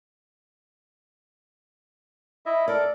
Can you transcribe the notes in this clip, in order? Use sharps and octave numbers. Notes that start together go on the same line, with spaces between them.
E4 D#5 E5
A4 A#4 D5